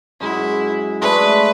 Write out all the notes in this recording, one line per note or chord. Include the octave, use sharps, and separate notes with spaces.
F#2 G#3 E4
G#3 A3 D4 B4